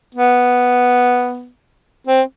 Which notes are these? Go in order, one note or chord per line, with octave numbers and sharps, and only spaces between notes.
B3
C4